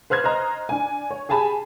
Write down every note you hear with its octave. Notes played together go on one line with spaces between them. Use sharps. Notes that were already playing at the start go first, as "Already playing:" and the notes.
B4 C5 F6 F#6 G#6
C5 D#5 A#5
D4 G#5
C#5
G4 G#4 G#5 A5 B5